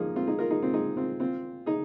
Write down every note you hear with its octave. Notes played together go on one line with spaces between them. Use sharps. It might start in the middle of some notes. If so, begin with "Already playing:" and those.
Already playing: F3 A#3 D#4 G#4
C4 F4
D#4 G#4
F4 A#4
D#4 G#4
C4 F4
D#4 G#4
C4 F4
C4 F4
D#4 G#4